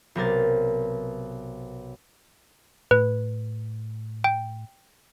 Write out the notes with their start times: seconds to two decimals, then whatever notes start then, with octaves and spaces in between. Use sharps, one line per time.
0.15 B1 C3 A#4 A6
2.91 A2 B4
4.24 G5